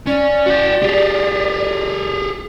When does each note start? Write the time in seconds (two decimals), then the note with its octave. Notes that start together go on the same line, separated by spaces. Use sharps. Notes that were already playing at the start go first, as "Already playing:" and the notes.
0.06 C#4 D5
0.46 F#4 G5
0.83 G4 G#4